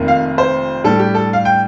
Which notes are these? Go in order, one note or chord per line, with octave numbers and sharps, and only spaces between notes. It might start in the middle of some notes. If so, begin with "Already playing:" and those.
Already playing: F1 F2 D#3 A#3
F5
C5
A2 G3 D4 A4
G4
A4
F5
G5